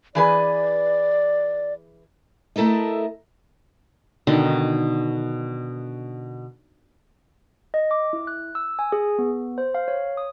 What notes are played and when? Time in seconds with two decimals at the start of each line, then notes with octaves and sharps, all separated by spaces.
0.15 E3 G#4 B4 D5
2.56 A3 E4 A4 A#4 D#5
4.27 B2 D3 D#3
7.74 D#5
7.91 D6
8.13 E4
8.27 F#6
8.55 E6
8.79 G#5
8.92 G#4
9.18 B3
9.58 C5
9.75 F5
9.88 C#5
10.17 D#6